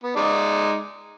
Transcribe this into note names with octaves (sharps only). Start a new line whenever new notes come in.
B3
G#3 D#4 D5